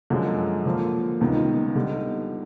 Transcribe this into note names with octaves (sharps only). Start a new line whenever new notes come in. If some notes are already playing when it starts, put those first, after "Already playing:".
F#2 D3 F3 G#3
D3 F3 A#3
C#2 C3 D#3 G3 B3
D3 G3 B3 D#4